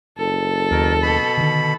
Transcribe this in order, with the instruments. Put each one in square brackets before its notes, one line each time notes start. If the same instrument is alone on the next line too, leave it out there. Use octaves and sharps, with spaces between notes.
[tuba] F#1 [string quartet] A4
[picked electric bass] D#2 [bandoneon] B2 A#4
[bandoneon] B2 B5
[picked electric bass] D3 D#3